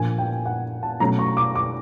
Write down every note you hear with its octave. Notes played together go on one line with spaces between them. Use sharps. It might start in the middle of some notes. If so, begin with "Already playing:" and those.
Already playing: A#2 F3 A#3 D4 G#5
G5
F#5
A5
B2 F#3 A3 C#4 A#5
C#6
D6
D6